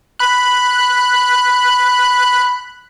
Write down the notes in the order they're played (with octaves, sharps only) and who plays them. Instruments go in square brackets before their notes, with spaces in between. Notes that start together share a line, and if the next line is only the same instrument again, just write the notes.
[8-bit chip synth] B5 F#6